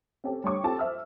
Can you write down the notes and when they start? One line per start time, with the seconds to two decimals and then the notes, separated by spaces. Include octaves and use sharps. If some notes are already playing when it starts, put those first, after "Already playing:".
0.24 C4 C#4 G4 A4
0.44 G3 C#5 C#6 D6
0.63 C4 F4 G4 A4 A5
0.78 C5 E5 E6 F6